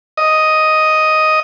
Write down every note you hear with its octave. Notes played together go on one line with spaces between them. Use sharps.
D#5